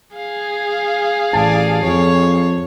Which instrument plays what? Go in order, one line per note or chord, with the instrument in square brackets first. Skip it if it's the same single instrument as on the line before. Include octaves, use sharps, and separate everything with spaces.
[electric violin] G#4 F5
[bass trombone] A1 [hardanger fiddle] D5 G#5 [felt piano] A5
[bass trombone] F2 [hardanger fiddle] C#5